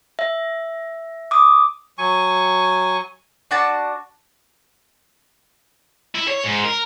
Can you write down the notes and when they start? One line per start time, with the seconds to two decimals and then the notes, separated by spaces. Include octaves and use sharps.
0.19 E5
1.31 D6 D#6
1.98 F#3 G#5 C#6
3.51 D4 F#4 A5
6.15 E4
6.28 C#5
6.43 G#2
6.64 A#4